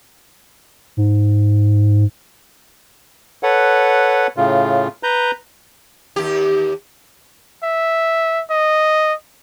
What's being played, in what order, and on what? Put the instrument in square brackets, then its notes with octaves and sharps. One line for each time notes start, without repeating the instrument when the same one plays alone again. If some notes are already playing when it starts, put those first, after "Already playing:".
[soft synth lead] G#2
[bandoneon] A4 B4 C#5 F#5
A2 C#3 F4
B4 A#5 G6
[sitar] D#2 G4
[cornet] E5
D#5